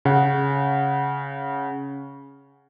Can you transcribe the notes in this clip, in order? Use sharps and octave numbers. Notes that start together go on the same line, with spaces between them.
C#3 F#5